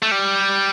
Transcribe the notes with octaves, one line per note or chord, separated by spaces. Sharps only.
A3
G3